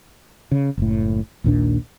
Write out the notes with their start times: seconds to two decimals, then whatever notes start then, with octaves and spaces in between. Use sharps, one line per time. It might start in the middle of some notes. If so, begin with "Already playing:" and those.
0.52 C#3
0.78 F#1 A2
1.44 A#1 D#2 A#2 D4